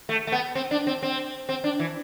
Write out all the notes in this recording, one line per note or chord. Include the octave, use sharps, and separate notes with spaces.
A3
A3
B3
C4
D4
C4
C4
C4
D4
E3